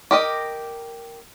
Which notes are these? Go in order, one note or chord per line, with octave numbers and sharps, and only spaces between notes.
G4 A#4 D#5